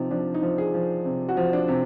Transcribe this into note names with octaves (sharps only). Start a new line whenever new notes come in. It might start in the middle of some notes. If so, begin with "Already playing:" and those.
Already playing: C3 F3 D#4
F3 D4
D#4
F3
G#4
F3
C3
F#4
F3
D4
C3